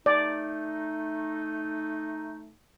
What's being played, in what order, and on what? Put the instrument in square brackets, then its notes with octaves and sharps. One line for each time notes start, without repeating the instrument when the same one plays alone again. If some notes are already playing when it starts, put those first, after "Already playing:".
[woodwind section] A3 D#4 [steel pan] D5